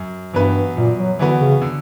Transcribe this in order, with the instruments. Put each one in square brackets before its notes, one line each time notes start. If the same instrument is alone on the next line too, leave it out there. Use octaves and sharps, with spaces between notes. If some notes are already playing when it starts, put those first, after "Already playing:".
Already playing: [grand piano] F#2
[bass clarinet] G2 [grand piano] E3 B3 F#4 B4
[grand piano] F#2 [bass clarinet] A#2
[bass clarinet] F#3
[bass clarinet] D3 [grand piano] E3 B3 F#4 B4
[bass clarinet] C#3
[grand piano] D3